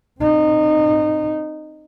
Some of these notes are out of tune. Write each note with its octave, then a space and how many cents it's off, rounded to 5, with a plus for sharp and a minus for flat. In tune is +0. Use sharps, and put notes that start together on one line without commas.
C4 +10 D#4 -20